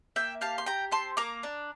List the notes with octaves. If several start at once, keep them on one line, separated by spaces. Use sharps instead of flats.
A#3 E5 G5
G4 F5 A5
C6
G4 G5 A#5
C4 A5 C6
A#3 A#5 D6
D4